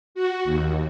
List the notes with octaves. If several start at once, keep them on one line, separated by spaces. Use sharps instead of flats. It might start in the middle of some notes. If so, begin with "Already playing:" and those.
F#4
D#2